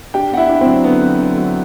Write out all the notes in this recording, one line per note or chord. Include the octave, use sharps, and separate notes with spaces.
D4 G4 G5
B3 F#5
E4 E5
D4
C4 C5
F#3
D3 B3 B4
F#3
D3
F#3